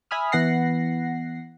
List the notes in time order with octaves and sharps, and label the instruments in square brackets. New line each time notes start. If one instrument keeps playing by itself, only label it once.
[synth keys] E5 G#5 B5 D#6 F6
E3 B3 F#5 A#6 C7